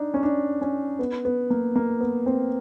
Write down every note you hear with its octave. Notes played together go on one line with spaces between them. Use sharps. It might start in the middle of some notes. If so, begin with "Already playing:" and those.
Already playing: D4 D#4
C#4
D4
C#4
B3
B3
A#3
A#3
B3
C4